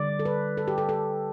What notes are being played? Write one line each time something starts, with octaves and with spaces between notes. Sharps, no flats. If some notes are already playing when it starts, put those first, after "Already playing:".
Already playing: D3 G3 D5
A4
B4
A4
G4
A4
A4